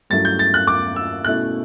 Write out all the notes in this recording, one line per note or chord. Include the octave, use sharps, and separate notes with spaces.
G2 F#3 A3 C#4 E4 A6
G6
A6
F#6
D6
E6
B2 A3 C#4 E4 F#6